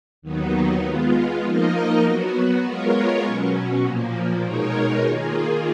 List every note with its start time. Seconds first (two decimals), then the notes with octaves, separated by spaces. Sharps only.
0.22 D#2 D#3 F#3 B3 D#4
0.82 G#3 B3 F4
1.42 F3 A#3 D#4 A#4 D#5
2.03 F#3 B3 F#4
2.63 G#3 B3 F4 A#4 C#5
3.23 B2 F#3 C#4
3.84 A#2 F3 A#3
4.43 B2 G#3 D#4 A#4 C#5
5.04 D#3 A#3 F4 G#4